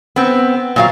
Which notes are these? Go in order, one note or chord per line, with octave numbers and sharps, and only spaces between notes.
B3 C4
A#2 F#3 F5